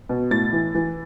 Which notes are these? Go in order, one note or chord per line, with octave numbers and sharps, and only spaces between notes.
B2
A2 A6
E3
E3